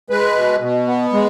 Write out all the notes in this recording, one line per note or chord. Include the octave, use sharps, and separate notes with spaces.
G#3 B4
B2
B2
B3
G#3